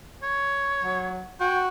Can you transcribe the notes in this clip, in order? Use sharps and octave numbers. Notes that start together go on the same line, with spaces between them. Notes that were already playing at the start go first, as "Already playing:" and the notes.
C#5
F#3
F#4 G5